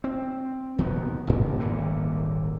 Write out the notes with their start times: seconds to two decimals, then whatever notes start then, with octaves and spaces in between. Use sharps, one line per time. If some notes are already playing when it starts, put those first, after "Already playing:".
0.04 C4
0.78 D#2 B2 D#3 B3
1.27 A1 G#2 C3
1.60 D#1 G#1 D3 A#3